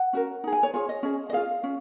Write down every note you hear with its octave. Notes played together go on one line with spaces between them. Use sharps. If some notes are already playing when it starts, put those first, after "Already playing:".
Already playing: F#5
C#4 F#4 A#4
D#4 G#4
G#5
C#5
F4 G#4 C#5
D#5
C#4 G#4
D#5
F4 G#4 F5
C#4